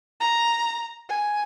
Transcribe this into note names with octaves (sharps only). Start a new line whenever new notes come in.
A#5
G#5